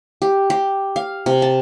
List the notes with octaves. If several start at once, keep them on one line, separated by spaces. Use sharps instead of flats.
G4
G4
F5
C3
A5